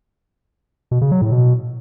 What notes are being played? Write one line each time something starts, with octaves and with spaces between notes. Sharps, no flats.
B2
C#3
F#3
A2
B2